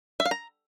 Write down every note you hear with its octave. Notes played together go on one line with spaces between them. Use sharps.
E5
F5
A#5